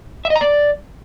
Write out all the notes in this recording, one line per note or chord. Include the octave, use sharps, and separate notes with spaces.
E5
D#5
A#5
D5